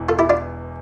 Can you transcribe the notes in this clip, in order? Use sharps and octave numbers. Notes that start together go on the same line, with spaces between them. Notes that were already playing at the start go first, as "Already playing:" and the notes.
Already playing: E1 E2 E3
F4 A4
E4 G4
D4 F4